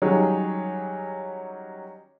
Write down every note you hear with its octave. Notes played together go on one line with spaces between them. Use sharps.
D#3 F#3 G3 C#4 G#4